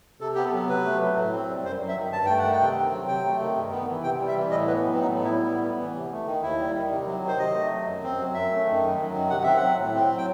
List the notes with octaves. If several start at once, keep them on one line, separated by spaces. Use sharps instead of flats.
C3 A4
B3 G4
A4
F#3
C3 B4
A3
F#3
A2
C4
G3
F#2 C5
F#3
E5
D#3
G2 A5
A3 G5
F#5
D#3
G5
C3
C4
F#3
C3 G5
A3
D#3
G2
B3
E3
C3 G5
G3
E5
E3
A2 D#5
B3 B4
F#3
C4
A2 D#4
B3
E4
G3
A2
B3
E3
C3
A3
D#3
D#2 E4
G3
D#3
C3
F#3
D#3
C5
C3 D#5
A3
F#3
F#2
C4
F#3
F#2 E5
A3
D#3
F#2
F#3
D#3
C3 F#5
C4 E5
F#5
F#3
A2
C4
F#3
G5